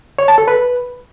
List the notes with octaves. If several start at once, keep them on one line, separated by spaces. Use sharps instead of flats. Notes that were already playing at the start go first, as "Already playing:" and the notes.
C#5
A5
A4
B4